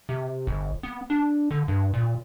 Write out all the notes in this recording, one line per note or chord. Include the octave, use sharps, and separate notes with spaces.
C3
G1
B3
D4
D3
G2
A#2